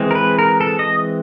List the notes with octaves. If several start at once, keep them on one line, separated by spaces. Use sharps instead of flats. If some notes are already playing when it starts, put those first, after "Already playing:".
Already playing: E3 G#3 C4
A#4
B4
A#4
A4
D#5